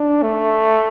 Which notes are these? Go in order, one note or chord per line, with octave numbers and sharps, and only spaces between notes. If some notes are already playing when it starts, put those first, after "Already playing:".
Already playing: D4
A3